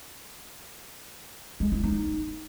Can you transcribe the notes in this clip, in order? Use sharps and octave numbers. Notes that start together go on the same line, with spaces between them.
G#3
E4
D#4